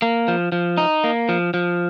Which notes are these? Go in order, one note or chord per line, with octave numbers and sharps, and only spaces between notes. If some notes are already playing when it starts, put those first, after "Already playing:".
A#3
F3
F3
D#4
A#3
F3
F3